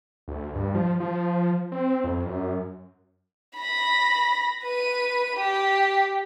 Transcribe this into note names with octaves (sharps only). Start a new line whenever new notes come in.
D2
G2
F3
F3
C4
F2
F#2
B5 A#6
B4 D#7
G4